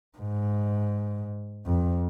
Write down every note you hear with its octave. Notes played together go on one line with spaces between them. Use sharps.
G#2
F2